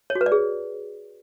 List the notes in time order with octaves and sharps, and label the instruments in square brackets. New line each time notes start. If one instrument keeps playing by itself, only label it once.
[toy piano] C#5
F#4
B4
D5
G#4